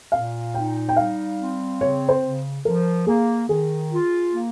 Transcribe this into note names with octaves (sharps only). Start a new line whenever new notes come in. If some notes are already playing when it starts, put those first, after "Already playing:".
A#2 F5
D#4 G5
G5
G3 F5
C4
C#3 C#5
C5
C#3
F3 A#4
A#3 G#4
D#3 G#4
F4
A#3